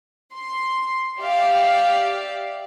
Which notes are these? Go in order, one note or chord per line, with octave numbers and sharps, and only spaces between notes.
C6
G4 D5 E5 F5